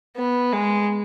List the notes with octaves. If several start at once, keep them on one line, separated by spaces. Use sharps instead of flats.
B3
G#3